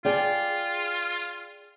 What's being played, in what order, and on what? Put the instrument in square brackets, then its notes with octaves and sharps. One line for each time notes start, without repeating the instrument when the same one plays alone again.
[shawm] F4 [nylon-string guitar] G#4 D5 G5